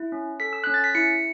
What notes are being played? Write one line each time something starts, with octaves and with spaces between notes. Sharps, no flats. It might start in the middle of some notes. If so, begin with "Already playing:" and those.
Already playing: E4
C#4
A4 B6
E6
C#4 F#6
A6
B6
E4 C#7